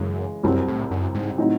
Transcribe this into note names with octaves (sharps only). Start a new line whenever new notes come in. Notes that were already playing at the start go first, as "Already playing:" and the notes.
Already playing: F#2 C#3 E3 G#3
C2 F#2 C3 F#3 C4
A2
F#2
G#2
A2 F#3 C4 D#4